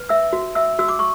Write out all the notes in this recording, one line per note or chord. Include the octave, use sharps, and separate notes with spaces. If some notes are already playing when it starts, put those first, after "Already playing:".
Already playing: B4
E5 E6
F#4
E5 E6
F#4 E6
D6
C#6